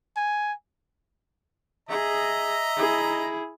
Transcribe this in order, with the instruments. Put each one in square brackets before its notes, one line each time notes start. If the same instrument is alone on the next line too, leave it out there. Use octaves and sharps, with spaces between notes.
[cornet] G#5
[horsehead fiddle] G#4 [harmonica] D#5 A#5 [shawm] E5
[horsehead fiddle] E4 G#4